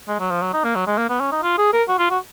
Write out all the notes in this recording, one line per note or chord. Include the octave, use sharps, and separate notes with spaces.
G#3
F#3
F3
F#3
D#4
A#3
F#3
G#3
A#3
B3
C#4
D#4
F4
G#4
A#4
F#4
F4
F#4